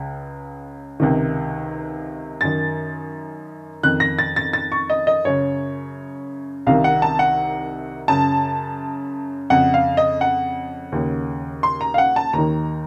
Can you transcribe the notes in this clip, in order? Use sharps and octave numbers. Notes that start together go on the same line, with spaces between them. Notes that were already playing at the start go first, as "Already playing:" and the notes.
Already playing: C#2 C#3
C#2 C3 D#3
F#2 D#3 A6
F2 D#3 F#6
A#6
A6
A6
A6
C#6
D#5
D#5
F#2 C#3 C#5
C2 C3 D#3 F5
F#5
A5
F#5
F#2 C#3 A5
F2 C#3 F#5
F5
D#5
F#5
D#2 C#3
C6
A#5
F5
F#5
A5
D#2 D#3 A#5